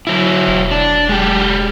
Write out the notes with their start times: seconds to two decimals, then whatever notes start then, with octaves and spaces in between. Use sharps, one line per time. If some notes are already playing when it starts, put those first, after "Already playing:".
0.07 F#3 E4
0.48 E1
0.71 D4
1.09 G#3 G4